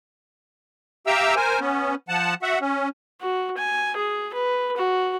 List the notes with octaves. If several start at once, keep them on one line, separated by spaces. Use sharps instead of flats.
G4 E5 F5 G5 A#5 E6
A#4 C5 G#5
B3 C#4
F3 F#5 A5
F#4 E5 F#5
C#4
F#4
G#5
G#4
B4
F#4